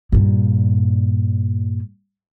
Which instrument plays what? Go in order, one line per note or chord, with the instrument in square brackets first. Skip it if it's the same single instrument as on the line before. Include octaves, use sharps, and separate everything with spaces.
[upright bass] G2 A#2